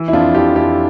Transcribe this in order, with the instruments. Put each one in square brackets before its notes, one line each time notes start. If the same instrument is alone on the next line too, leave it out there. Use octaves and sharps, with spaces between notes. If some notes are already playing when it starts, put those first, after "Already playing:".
Already playing: [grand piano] E3
E4
F2 D4 F4
E3 E4 G4
F2 E4 G4